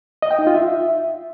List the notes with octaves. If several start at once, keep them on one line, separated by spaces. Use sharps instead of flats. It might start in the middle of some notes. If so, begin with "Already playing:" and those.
D#5
G5
D#4
F4
E5